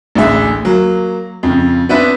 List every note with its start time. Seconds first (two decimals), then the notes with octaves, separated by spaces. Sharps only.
0.15 A1 D2 D4 G#4 E5
0.65 F#3 A#3
1.43 F2 C#3
1.89 B3 C4 D4 B4 E5